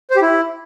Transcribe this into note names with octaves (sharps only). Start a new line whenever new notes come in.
C5
G4
E4